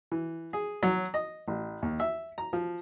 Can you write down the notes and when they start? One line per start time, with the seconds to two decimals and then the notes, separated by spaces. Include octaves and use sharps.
0.12 E3
0.53 G#4
0.83 F#3
1.14 D#5
1.48 A1
1.82 D#2
2.00 E5
2.38 A#5
2.53 F3